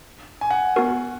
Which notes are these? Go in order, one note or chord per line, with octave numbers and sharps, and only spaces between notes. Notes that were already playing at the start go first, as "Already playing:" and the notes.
G#5
F#5
B3 F#4 A#4